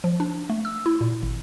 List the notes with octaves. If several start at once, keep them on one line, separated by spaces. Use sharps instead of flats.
F3
D4
A3
E6
E4
A#2
G#1